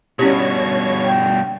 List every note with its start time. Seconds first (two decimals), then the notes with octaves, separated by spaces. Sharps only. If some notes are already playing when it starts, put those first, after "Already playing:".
0.19 G2 B2 C#4 E4 G4 C#5 C#6 G#6
1.06 G5